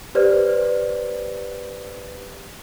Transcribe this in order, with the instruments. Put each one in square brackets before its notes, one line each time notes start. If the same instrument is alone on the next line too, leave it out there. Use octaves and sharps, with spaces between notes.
[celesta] G4 B4 C5 D5